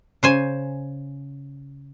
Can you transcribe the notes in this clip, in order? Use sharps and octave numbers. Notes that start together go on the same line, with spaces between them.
C#3 C5 G#5